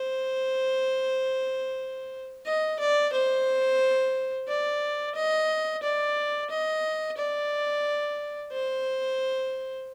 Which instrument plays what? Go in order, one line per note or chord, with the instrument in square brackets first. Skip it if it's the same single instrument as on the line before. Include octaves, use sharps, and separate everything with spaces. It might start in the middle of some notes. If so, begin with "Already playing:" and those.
Already playing: [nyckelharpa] C5
D#5
D5
C5
D5
D#5
D5
D#5
D5
C5